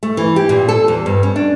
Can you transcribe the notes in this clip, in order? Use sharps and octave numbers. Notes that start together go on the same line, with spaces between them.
A3
E3
G4
A#2
A4
E2
G2
C#4
D4